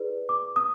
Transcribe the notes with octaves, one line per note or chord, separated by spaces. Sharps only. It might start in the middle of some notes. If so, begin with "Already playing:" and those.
Already playing: E4 G#4 B4 D5
D6
D#6